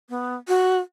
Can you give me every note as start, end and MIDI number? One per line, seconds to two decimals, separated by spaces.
0.10 0.35 59
0.48 0.78 66